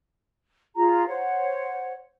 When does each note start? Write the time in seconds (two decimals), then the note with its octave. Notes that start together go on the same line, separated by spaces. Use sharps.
0.76 F4 G#4 A#5
1.07 C5 C#5 F#5